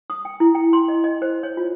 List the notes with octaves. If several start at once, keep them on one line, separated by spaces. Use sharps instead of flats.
D#6
G5
E4
G5
C6
D#5
D#5
C5
C#5
F4